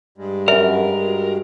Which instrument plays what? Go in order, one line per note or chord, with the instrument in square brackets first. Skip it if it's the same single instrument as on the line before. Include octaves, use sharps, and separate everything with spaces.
[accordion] G2 G3 G#3
[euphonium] F#2 [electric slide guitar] A#4 [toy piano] E5
[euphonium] F#4